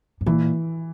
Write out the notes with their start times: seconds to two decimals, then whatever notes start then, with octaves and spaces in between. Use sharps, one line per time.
0.21 G#2
0.26 A#2 E3